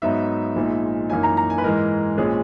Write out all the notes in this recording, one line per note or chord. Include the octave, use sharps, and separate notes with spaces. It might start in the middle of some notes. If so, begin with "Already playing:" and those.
G#2 F#3 B3 D#4 E5
A#1 A#2 G#3 D#4
F#2 E3 A#3 D#4 G#5
A#5
A#5
G#5
B4
G#2 E3 G#3 A#4
A#1 A#2 G#3 C#4 G#4